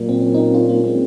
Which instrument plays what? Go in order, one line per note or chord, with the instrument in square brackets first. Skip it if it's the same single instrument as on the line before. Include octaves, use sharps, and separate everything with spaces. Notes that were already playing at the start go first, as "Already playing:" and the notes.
Already playing: [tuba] A#2 [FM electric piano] F#3 A#3
[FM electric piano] C4
C#4
C4 D#4
C#4 F4
A#3 C#4
G#3 C4